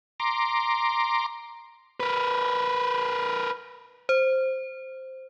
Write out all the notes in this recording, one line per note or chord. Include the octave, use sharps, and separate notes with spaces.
A#5 C6 D6
A#4 B4
C5